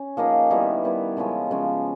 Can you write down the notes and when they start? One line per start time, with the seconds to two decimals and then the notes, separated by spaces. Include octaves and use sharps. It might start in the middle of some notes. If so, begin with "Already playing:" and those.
Already playing: C#4
0.17 F3 A#3 D#4 G#4
0.50 D#3 G3 B3 E4
0.84 D#3 G3 B3 E4
1.17 C#3 F3 G#3 C#4
1.51 C#3 F3 G#3 C#4